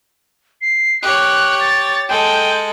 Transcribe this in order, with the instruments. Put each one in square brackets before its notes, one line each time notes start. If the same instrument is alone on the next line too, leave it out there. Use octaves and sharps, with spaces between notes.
[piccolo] C7
[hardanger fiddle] G4 C#5 [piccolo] F#6
[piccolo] A6
[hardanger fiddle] G#3 A4 [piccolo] G5